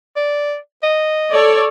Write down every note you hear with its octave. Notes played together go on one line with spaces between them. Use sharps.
D5
D#5
A4 C#5 D5